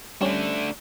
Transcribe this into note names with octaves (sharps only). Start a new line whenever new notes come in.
G3 A3 C#4 D4